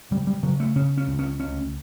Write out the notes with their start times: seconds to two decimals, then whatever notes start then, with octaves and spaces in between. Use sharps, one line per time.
0.11 C#3 G3
0.27 G3
0.43 C#3 F#3
0.60 A3
0.76 C#3 C#4
0.97 C#4
1.07 C#2
1.19 C#4
1.39 D2 C#4